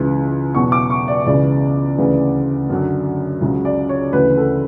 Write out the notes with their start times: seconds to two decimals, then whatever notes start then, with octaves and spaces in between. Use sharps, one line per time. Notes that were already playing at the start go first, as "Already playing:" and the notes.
Already playing: C#2 C#3 E3
0.54 E2 B2 F#3 C#6
0.72 D6
0.90 C#6
1.08 D5
1.27 C#2 C#3 E3 D5
1.98 D2 C#3 E3
2.70 F#2 D3 F#3
3.42 C#2 C#3 F#3
3.65 D5
3.89 C#5
4.13 D2 C#3 E3 B4
4.37 A4